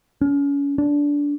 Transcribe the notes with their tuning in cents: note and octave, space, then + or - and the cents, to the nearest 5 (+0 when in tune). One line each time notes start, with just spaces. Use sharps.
C#4 +30
D4 -20